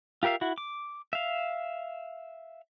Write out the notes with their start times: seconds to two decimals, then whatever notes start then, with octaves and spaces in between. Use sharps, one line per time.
0.23 F4 G4 A#4 E5 F5
0.41 E4 F#4
0.58 D6
1.13 E5 F5